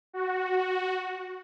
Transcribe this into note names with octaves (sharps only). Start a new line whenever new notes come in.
F#4